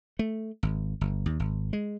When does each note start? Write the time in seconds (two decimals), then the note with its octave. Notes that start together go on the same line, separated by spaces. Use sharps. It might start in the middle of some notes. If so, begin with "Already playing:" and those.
0.19 A3
0.63 G#1
1.01 G1
1.26 D#2
1.40 G#1
1.73 G#3